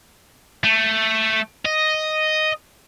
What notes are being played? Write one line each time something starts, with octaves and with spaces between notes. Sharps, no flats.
A3
D#5